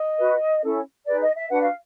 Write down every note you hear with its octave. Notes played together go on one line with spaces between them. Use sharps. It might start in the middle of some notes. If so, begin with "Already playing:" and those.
Already playing: D#5
F#4 B4
C#4 E4 A4
D#4 G#4 B4 D5
D#5
E5
D4 F#4 B4 F#5
F5